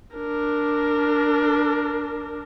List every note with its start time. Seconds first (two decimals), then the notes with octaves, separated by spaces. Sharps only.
0.16 D4 A#4